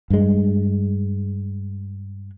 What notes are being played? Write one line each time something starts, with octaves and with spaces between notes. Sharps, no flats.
G2 G#3